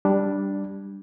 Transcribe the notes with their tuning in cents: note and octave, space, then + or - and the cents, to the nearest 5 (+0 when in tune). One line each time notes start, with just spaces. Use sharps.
G3 +0 D4 +0